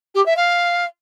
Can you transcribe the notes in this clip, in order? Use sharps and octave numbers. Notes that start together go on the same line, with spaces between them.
G4
E5
F5